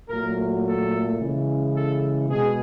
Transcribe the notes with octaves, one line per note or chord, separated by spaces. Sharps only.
A#2 F#3 A3 A#4
A4
C#3 E3 G#3
A4
B2 G#3 G#4